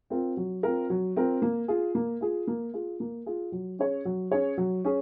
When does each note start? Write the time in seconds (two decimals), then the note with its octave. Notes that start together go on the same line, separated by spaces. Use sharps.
0.10 C4 F4 A#4
0.37 F#3
0.63 C4 F4 A#4
0.90 F#3
1.16 C4 F4 A#4
1.42 A#3
1.68 F4 G#4
1.95 A#3
2.21 F4 G#4
2.47 A#3
2.74 F4 G#4
3.00 A#3
3.26 F4 G#4
3.52 F#3
3.79 C#4 G#4 C#5
4.05 F#3
4.32 C#4 G#4 C#5
4.58 F#3
4.85 C#4 G#4